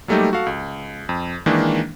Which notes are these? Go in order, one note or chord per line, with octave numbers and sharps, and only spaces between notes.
F#3 G3 A3 A#3 D#4 G4
F#4 A4 F5
C#2
F2
D#3 E3 G#3 A#3 D4